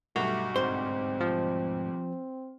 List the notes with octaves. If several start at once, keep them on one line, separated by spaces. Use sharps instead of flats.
B1 G2 A3 F#4
D2 G#2 C4 C5
F3